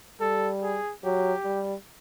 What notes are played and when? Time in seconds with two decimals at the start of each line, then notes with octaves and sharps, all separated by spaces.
0.21 G3 A4
0.63 G#4
1.04 F#3 G4
1.45 G3